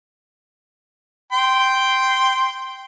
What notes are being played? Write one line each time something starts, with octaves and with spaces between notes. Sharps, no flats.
G5 C6